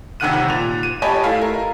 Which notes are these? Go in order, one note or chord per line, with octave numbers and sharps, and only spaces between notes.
G1 C3 D#3 F#5 F#6 D#7
A#2 F7
D#7
G4 C#5 D#5 G#5 A5 B5
A3 E4 F5
A#4